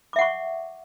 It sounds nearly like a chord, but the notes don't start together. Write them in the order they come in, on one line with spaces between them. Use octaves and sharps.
D6 E5 F#5 C#6